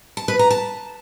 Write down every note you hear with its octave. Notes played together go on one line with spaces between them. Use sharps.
A5
B4
A#5
A5